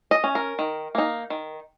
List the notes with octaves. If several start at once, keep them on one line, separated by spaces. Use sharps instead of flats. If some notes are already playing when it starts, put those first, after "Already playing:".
D#5
C#4
A#4
D#3
A#3 D#4
D#3